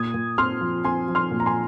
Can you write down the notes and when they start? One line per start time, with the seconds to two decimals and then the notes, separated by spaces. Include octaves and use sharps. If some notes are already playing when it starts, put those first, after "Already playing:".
Already playing: A#2 D#6 G#6
0.14 A#2
0.38 C4 C6 F6
0.61 F3
0.85 C4 G#5 C6
1.08 F3
1.15 C6 F6
1.31 A#2
1.40 A#5
1.46 G#5 C6